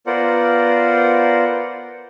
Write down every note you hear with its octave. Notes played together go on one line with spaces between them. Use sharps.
B3 F4 A#4 C5 D5 F#5